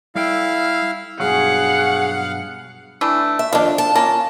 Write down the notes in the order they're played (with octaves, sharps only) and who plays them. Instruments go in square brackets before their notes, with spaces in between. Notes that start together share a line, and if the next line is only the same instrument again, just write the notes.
[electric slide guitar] G3 A4 G5 [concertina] E4 F5
[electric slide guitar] G2 B2 F#3 [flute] G#4 [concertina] F5 [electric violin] F#5
[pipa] E3 A3 D4
[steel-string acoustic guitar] E5
[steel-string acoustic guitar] F2 D#3 [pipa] D4 F4
[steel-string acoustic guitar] A5
[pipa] A#3 C#4 F4 [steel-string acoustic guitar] A5